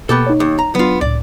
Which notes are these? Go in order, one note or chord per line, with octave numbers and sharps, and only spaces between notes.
B2 A#3 B3 G4 A4
D#4 C#5
D#2
A#5
F#3 B3 D4 F4
C#2 A2 D5